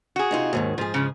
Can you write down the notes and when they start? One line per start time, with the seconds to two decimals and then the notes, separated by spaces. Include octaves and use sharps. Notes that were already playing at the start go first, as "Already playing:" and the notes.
0.16 F#4 G#4
0.31 C3 D#4 F4
0.53 D#2 G#2 D#3
0.78 G#2 F3 G#4
0.94 C#3 F3